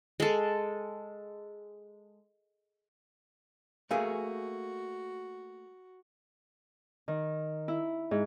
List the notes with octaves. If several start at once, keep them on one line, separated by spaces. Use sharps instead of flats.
G#3 A4
A3 A#3 F#4 G#4 B4 F5 G#5
D#3
E4
G#2